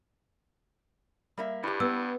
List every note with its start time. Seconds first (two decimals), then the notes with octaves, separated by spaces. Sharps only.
1.38 G3 A#3 E5
1.63 G2 E4 G4
1.80 B3 E6